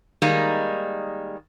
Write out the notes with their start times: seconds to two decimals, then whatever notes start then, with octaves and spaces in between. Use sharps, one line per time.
0.22 D#3 G3 G#3 A#3 D#4